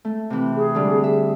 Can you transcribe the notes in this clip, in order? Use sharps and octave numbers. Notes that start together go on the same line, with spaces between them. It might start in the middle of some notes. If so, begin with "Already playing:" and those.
A3
C3 E3
G#4
D3 G3
E5